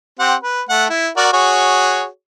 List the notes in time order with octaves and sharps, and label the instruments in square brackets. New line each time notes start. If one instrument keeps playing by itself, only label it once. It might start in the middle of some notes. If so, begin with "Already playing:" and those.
[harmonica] C4 G4 F#5
B4
A3 F#5
E4
F#4 A#4 D5
F#4 G#4 C#5